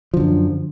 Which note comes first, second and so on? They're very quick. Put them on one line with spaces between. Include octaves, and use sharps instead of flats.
F3 D3 F#2